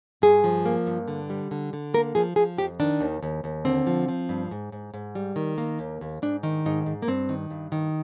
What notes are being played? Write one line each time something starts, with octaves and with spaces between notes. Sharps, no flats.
G2 G#4
F3
A#3
G2
D3
G3
D3
D3
A#3 A#4
F3 G#4
F3 G#4
F2 G4
D#3 D4
D#2
D#2
D#2
D3 C4
F3
F3
G2
G#2
G#2
G#2
G3
D#3
A#3
D#2
D#2
G#2 D4
D#3
G#2 D#4
G#2
A#3
G2 C4
D#3
G2
D#3